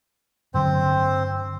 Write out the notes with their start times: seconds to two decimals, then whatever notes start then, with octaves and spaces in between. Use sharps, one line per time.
0.54 G2 D3 F#3 C4 C5